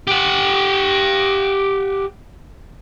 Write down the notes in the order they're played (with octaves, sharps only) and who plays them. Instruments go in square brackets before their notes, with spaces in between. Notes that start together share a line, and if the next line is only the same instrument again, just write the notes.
[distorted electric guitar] G4 F#5